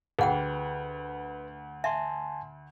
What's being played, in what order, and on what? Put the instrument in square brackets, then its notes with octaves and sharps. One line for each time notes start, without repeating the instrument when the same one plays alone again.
[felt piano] D2 [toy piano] G#4 F#5 G5 [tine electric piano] B4
[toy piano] E5 [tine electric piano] G#5 A5 C6